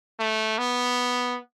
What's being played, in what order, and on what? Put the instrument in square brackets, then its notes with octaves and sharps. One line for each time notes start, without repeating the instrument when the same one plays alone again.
[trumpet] A3
B3